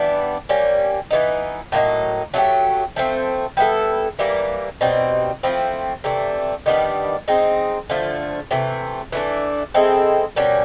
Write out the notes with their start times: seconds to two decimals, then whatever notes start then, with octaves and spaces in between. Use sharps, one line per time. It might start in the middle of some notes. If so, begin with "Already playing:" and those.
Already playing: E3 G3 B3 D4
0.49 G3 A#3 C#4
1.11 E3 G3 B3 D#4
1.72 A2 F#3 A#3 D#4
2.34 F#3 A3 D4 G4
2.96 F3 A3 C4
3.57 G3 B3 E4 A4
4.19 E3 G3 A#3
4.81 B2 G3 C4 D#4
5.43 F3 A3 C4 E4
6.04 C3 E3 A3 D4
6.66 D#3 G3 B3 D4
7.28 G#3 C4 D#4
7.90 D3 F3 A3
8.51 C3 E3 A3
9.12 E3 A3 D4
9.74 G#3 C4 E4 A4
10.36 B2 G3 A#3 C#4